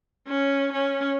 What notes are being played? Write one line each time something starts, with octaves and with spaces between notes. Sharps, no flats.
C#4
C#4